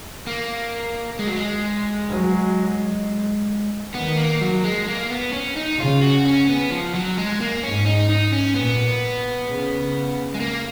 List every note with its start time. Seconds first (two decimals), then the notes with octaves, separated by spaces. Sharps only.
0.27 A#3
1.19 G#3
1.27 F#3
1.36 G#3
2.11 F#3
3.95 D#3 B3
4.18 A#3
4.42 F#3
4.64 G#3
4.88 A#3
5.10 B3
5.33 C#4
5.57 D#4
5.79 C#3 F4
6.02 F#4
6.25 C#4
6.49 B3
6.71 F3
6.95 F#3
7.18 G#3
7.41 A#3
7.64 G#2 C#4
7.86 D#4
8.09 D#4
8.33 C#4
8.56 A#2 B3
9.48 C#3
10.34 G#3
10.40 A#3